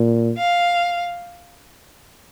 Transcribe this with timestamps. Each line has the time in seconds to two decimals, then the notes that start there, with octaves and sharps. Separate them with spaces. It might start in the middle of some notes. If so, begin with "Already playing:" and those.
Already playing: A#2
0.37 F5